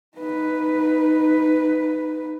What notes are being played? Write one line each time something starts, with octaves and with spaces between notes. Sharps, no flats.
D#4 B4